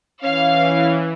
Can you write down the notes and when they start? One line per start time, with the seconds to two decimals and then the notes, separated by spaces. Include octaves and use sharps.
0.23 E3 C#4 F5